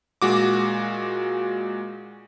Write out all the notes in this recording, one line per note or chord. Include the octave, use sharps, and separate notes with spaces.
A#2 G#3 F#4 D6